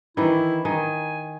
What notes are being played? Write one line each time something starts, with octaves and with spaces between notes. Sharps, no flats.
D#3 E3 E4
D#3 G#5